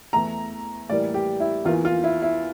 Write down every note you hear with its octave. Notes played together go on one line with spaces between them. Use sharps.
E2 E3 A3 A#5
A2 E3 G3 A#3 D5
G4
E4
E2 E3 A#3 F4
F4
E4
E4